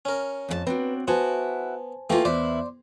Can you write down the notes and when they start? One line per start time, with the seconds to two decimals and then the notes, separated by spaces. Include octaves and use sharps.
0.05 C#4 A#4
0.49 F2 G#4 A5
0.67 C4 D4 F#4 B4
1.08 B3 E4 F#4 C5 G#5 A5
2.10 E3 A3 A#3 F4 G4
2.25 E2 E4 B4 C5 D5 C6 D6